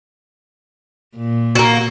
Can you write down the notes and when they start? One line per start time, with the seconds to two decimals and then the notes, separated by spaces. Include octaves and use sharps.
1.17 A#2
1.55 A#3 F#4